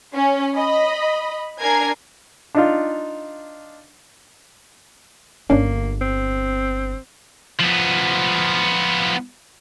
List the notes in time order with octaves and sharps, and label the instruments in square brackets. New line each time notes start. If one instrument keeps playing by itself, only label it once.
[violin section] C#4
D#5 B5
D4 A#4 G#5 A#5 G#6 C7
[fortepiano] D4 D#4 F4
[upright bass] G1 D3 [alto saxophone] A#3 [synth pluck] C#4 D4
[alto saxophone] C4
[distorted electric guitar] F3 B3